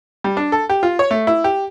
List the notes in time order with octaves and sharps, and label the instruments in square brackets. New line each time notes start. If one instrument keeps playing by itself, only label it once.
[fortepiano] G3
D4
A4
G4
F4
C#5
A3
E4
G4